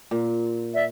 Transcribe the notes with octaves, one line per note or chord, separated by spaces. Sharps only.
A#2
D5 E5